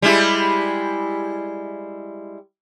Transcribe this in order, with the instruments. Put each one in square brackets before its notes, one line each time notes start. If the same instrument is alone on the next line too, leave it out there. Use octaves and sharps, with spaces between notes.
[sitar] G3 G#3 E4